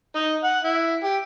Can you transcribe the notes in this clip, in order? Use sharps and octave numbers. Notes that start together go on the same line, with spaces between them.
D#4
F#5
E4
G4